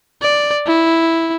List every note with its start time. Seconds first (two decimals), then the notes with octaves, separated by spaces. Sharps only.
0.22 D5
0.66 E4